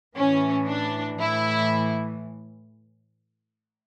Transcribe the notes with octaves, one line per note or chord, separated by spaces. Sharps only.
A2 E3 C#4
D4
A2 E3 E4